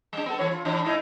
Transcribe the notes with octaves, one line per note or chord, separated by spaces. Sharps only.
G3 D4
B3 A4
E3 C#5
F4
A2 E3 D4
G#2 D#4 E4